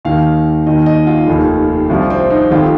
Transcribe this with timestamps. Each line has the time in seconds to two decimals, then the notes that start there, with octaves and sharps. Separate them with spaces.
0.05 D#2 D#3 F5
0.66 D#2 D#3 D#5
0.86 D#5
1.07 F4
1.28 F1 D#2 D#3
1.90 C2 C3 F3
2.10 C4
2.30 D#4
2.51 F1 F2 D#3 F4